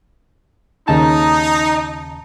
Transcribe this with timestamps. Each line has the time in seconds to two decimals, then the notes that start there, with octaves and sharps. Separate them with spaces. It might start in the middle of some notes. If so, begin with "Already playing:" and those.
0.88 D#2 C#3 D#4 A5